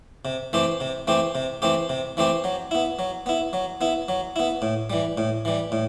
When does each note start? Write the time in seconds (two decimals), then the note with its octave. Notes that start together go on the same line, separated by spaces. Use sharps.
0.25 C3
0.53 E3 A3 C4 G4
0.80 C3
1.07 E3 A3 C4 G4
1.35 C3
1.62 E3 A3 C4 G4
1.89 C3
2.17 E3 A3 C4 G4
2.44 F#3
2.71 B3 E4
2.99 F#3
3.26 B3 E4
3.53 F#3
3.81 B3 E4
4.09 F#3
4.36 B3 E4
4.62 A2
4.90 E3 G3
5.18 A2
5.45 E3 G3
5.72 A2